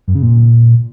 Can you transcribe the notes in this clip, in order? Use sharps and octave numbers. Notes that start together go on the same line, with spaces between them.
F#2
C#3
A#2